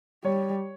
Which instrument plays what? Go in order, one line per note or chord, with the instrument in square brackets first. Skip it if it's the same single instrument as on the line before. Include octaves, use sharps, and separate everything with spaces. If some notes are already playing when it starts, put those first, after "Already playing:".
[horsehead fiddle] G3 [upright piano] C#5